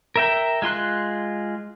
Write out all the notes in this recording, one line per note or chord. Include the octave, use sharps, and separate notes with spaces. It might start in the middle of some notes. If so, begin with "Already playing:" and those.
A#4 E5 G5
G#3 F4 C6 F#6